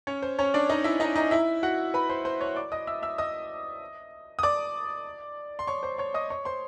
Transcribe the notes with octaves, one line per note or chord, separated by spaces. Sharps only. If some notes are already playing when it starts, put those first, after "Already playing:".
C#4 C#5
C5
C#4 C#5
D4 D5
D#4 D#5
E4 E5
D#4 D#5
D#4 D#5
E4 E5
F#4 F#5
B4 B5
C5 C6
C5 C6
C#5 C#6
D5 D6
D#5 D#6
E5 E6
E5 E6
D#5 D#6
D#6
D5 D6
C6
C#5 C#6
C5 C6
C#5 C#6
D#5 D#6
C#5 C#6
C5 C6